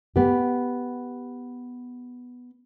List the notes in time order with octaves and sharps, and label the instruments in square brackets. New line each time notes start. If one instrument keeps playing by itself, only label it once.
[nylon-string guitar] B3 G4